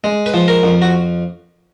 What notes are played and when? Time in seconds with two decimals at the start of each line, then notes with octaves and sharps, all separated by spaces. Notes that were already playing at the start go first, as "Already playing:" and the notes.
0.04 G#3
0.26 B4
0.34 F3
0.48 A#4
0.63 F2
0.82 F#4